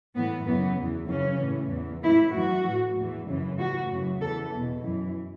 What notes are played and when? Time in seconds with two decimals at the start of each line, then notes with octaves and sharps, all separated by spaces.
0.16 A2 E3 B3
0.47 F#2 C#3 E3 B3
0.78 E2 E3
1.09 F#2 C#3 E3 C#4
1.41 A2 E3
1.72 E2 E3
2.03 A2 E3 E4
2.34 F#2 E3 F#4
2.66 A2 E3
2.97 E2 E3
3.27 F#2 C#3 E3
3.58 A2 E3 F#4
3.90 F#2 C#3 E3
4.21 E2 E3 A4
4.53 E2 B2
4.84 F#2 E3